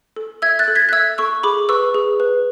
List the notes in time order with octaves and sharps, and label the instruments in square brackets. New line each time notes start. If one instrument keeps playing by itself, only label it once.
[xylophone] A4
E5 E6 G#6
F#6 A6
A4
G#6 B6
F#6
E5 E6 G#6
A4 C#6 E6
G#4 B5 D6
B4 C#6 E6
G#4
B4